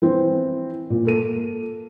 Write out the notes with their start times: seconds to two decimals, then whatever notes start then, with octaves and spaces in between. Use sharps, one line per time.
0.02 E3 C4
0.90 A#2
1.05 A#3 A4 D#7